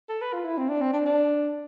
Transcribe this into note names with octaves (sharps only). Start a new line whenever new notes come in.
A4
B4
F4
E4
C4
D4
C4
D4
D4